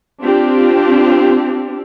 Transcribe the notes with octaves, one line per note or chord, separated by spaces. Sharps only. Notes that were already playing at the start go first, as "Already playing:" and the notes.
C4 D4 F4 G4